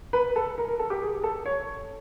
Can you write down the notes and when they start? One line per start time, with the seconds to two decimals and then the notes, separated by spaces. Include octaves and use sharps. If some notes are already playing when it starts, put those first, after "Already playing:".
0.13 B4
0.36 A4
0.58 A#4
0.68 A#4
0.79 A4
0.90 G4
1.02 G#4
1.23 A4
1.46 C#5